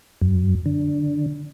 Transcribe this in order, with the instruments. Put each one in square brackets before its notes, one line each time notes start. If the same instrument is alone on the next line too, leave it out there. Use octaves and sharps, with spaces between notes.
[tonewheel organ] F#2
D3